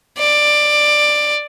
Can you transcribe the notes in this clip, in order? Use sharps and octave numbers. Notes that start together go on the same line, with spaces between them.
D5